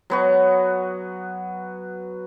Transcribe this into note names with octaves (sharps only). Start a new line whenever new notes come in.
F#3 B3 F#4